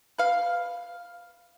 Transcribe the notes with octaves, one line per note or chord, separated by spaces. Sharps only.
B4 F5